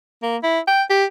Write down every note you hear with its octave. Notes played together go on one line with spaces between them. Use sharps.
A#3
E4
G5
G4